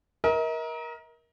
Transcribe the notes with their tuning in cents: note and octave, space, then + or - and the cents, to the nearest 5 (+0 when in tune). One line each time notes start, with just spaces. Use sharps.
A#4 +20 D#5 +45